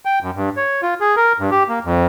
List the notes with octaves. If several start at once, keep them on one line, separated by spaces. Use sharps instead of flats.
G5
F#2
G2
C#5
F4
G#4
A#4
G2
G4
A#3
F2